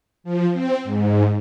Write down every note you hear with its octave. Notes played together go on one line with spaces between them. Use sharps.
F3
C4
G#2